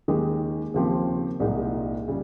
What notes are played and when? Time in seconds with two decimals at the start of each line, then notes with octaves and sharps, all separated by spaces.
0.08 D#2 D#3 G#3 D#4 G4
0.74 D#2 C#3 F3 C4 G4
1.40 C2 A#2 G#3 D#4 G4
2.08 C#3 G3